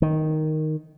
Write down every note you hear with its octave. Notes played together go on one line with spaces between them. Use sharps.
D#3